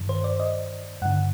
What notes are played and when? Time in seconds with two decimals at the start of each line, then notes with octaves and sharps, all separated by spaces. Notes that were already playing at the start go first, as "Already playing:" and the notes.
Already playing: G2 D#3
0.09 C5
0.24 D5
0.40 D#5
1.02 G2 D3 F#5